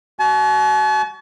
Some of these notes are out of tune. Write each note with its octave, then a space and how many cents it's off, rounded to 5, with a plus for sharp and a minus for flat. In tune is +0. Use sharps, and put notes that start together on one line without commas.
F#4 +25 A5 -45